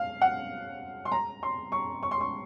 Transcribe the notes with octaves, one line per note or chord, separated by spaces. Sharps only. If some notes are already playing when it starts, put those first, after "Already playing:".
Already playing: F5
F#5
C6
A#5
C6
C#6
C#6
C6
C#6